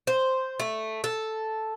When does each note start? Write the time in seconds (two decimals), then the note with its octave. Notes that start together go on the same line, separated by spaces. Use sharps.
0.07 C5
0.60 A3
1.04 A4